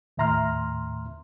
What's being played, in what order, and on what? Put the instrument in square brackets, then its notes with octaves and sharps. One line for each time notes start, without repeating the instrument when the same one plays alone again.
[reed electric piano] D#2 A2 E5 A#5 C6 F6